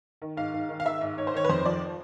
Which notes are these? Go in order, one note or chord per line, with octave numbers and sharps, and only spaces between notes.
D#3
G#2 F5
G#2
D#3
F5
D#3 E5
G#2
G#2 C#5
C5
D#3 C#5
B4
F2 C5
F3 D5